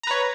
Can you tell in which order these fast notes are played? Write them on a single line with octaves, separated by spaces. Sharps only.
A#5 B4 C#5